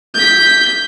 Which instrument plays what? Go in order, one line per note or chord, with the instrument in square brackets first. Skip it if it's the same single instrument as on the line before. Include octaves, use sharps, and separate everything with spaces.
[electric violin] G6 B6